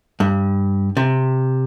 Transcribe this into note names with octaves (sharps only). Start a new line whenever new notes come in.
G2
C3